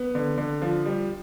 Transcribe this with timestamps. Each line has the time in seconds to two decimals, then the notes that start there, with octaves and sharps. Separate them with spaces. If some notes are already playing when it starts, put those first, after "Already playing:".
Already playing: B3
0.15 D3
0.38 D3
0.62 F3
0.86 G3